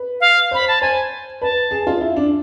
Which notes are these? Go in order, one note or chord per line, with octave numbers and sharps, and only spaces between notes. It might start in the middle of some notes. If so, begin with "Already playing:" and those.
Already playing: B4
F5
C5 B5
A5
C5 G#5
B4 A5
G#4
F4
E4
D4